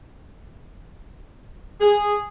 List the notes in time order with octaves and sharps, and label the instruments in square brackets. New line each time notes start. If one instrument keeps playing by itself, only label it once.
[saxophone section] G#4